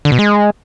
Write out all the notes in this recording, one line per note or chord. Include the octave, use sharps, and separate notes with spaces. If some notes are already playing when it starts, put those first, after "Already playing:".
D3
B2
G#3